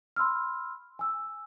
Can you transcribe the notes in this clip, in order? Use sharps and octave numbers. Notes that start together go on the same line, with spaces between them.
B5 C6 E6 F6
G#5 E6